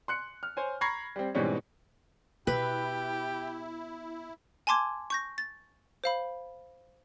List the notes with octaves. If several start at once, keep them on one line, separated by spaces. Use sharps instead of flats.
C6 F#6 C#7
F6
C5 C#5 G#5
A#5 B5 C#6 G#6 A#6 C7
G3 C4
G#2 B2 E3 G3 C4 C#4
B2 E4 G4 B4
G#5 A5 C6 D6 G#6
C#6 G6 A#6
A6
C5 F5 B5